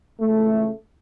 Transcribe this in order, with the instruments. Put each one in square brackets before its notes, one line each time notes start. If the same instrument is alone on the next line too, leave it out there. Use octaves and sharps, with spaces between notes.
[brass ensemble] C#2 C#3 E3 A3